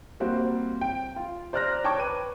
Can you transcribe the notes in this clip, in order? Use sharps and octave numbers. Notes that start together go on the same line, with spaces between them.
G3 A#3 C4 F#4
G5
F4
C5 D5 A#5 F6 F#6 A#6
C#5 G5 A5 C#6 D6 G#6
B4 D#7